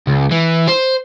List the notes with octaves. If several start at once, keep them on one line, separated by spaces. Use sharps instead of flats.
C#2
E3
C5